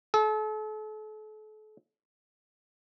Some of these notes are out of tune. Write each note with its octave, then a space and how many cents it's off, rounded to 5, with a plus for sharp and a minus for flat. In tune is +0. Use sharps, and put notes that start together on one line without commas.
A4 -40